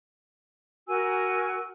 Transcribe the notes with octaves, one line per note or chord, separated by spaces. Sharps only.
F#4 A#4 G#5 E6